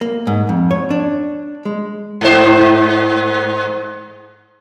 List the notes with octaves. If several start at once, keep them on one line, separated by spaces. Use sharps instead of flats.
A#3
G#2
F2
C#5
D4
G#3
G#2 C5